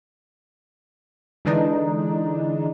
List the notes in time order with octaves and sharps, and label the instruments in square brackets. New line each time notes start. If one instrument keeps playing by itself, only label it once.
[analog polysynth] D3 E3 G#3 D4 D#4